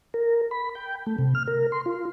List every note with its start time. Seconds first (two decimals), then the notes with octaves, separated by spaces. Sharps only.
0.14 A#4
0.51 B5
0.75 G5
1.06 A3
1.18 C3
1.35 F6
1.47 A#4
1.72 C6
1.86 F4